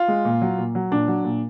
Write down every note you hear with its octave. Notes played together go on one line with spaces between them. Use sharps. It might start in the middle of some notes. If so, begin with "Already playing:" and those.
Already playing: F4
G#3
A#2
F#3
A#2
F#3
A#2 D4
F#3
A#2